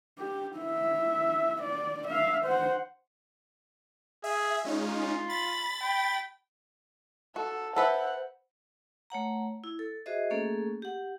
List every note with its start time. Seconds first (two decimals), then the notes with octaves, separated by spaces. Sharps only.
0.19 G4
0.57 E4 E5
1.62 D5
2.08 E5 F5
2.45 C5 F#5
4.24 G#4 E5
4.64 G#3 C#4 D#4 F4
5.30 B5 A6
5.83 G5 B5
7.36 F#4 A4
7.76 A4 B4 C5 E5 F#5
9.10 A3 C#5 F#5 A#5
9.64 E4
9.79 A4
10.06 F#4 G#4 C5 D#5 E5
10.30 A3 A#3 C#4 G#4 A4
10.82 G4 F#5